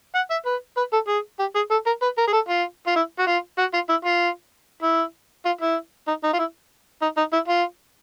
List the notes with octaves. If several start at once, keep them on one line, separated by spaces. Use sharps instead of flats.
F#5
E5
B4
B4
A4
G#4
G4
G#4
A4
A#4
B4
A#4
G#4
A4
F4
F4
E4
F#4
F4
F#4
F4
E4
F4
E4
F4
E4
D#4
D#4
F4
E4
D#4
D#4
E4
F4